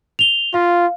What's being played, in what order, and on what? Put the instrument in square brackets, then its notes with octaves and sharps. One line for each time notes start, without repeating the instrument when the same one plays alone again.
[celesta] F7 G7
[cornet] F4 [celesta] F5